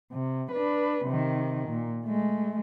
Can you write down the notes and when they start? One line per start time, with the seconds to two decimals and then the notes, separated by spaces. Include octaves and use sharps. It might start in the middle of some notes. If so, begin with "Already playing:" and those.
0.13 C3
0.52 D4 B4
1.06 C3 D#3
1.69 A#2
2.05 G#3 A3